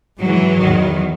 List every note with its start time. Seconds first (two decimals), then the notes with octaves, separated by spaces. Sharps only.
0.19 G#2 E3 F#3
0.59 E2 D#3